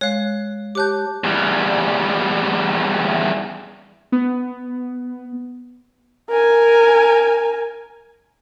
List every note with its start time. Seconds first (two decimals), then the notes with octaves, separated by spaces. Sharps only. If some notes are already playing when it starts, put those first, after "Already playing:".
0.01 G#3 C#5 F5 F#6
0.75 G4 C#5 A5 D6 F#6 G6
1.24 E2 G3
4.12 B3
6.29 A#4 G#5